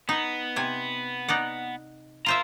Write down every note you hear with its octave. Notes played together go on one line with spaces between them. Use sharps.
B3 D#4
C3 G#5
D#4 D5 F#5
F4 C5 E5 F5 A#5